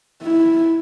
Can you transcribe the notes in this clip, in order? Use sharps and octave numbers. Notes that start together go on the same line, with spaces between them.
E4